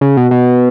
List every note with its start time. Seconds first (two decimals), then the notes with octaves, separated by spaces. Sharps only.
0.01 C#3
0.17 B2
0.31 B2